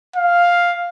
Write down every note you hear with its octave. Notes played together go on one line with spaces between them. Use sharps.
F5